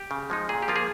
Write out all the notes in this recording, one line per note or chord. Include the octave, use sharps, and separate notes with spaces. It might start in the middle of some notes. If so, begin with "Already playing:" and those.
Already playing: G4
C#3
F3 G#3 D#4
A#2 G#4
G4
F3 A#3 F4
G#4